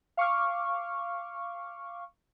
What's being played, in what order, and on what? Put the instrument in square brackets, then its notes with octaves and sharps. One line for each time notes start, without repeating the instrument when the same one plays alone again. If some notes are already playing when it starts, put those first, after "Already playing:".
[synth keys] F5 C#6 D6 F6